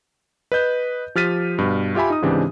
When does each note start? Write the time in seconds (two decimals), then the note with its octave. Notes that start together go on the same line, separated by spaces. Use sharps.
0.52 B4 D#5 G6
1.15 F3 G4 F6 A6 B6 D#7
1.58 G2 B2
1.95 F4 G4 E5 G#5 B5
2.10 D#4 D#6
2.22 G#2 C#3 E3 C4 D4 G4